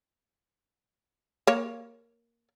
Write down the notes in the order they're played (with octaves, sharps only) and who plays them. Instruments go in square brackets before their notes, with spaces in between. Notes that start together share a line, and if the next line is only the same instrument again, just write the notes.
[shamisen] A#3 C#5